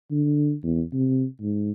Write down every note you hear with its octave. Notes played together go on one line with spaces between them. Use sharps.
D3
E2
C3
G#2